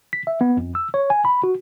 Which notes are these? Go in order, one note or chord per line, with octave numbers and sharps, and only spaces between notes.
B6
E5
B3
F2
E6
C#5
G#5
B5
F#4